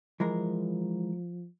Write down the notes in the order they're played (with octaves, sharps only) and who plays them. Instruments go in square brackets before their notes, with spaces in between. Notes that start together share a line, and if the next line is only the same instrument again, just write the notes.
[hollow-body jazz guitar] E3 G#3 A#4 [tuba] F3